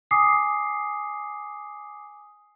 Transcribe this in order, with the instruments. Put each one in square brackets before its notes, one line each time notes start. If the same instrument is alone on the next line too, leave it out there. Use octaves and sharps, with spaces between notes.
[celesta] G#5 D6 D#6 C7